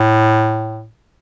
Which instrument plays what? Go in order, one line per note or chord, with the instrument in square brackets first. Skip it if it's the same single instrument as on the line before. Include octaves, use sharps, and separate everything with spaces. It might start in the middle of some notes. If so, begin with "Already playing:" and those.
Already playing: [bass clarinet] A2